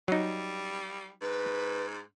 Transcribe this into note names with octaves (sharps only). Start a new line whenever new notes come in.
F#3 G3 D#4
G#2 B4